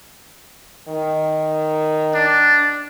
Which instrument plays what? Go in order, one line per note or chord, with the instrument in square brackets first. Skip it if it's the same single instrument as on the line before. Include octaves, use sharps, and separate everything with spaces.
[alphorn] D#3
[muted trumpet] D4